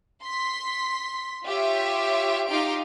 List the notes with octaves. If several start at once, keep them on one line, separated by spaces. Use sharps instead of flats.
C6 B6
F4 G4 C#5 E5
D#4 F4 G4 F5 C6 D7